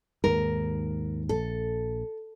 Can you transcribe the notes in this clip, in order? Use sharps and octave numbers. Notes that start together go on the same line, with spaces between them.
D#2 G#2 A#4
A#1 A4